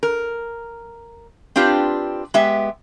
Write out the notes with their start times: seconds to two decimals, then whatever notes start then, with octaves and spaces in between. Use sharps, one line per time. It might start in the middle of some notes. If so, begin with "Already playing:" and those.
0.03 A#4
1.56 C4 D4 F4 G4 B4
2.34 G#3 B3 G4 E5